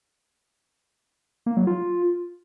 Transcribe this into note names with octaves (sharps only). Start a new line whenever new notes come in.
A#3
F#3
F4